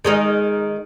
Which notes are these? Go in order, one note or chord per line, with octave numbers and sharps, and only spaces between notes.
D#3 G#3 D#4